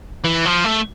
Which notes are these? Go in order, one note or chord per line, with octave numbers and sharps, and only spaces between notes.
E3
F3
A3